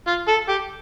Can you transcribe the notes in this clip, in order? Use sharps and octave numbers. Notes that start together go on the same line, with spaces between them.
F4
A4
G4